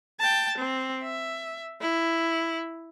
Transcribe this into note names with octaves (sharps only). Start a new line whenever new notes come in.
G5 A5
C4
E5
E4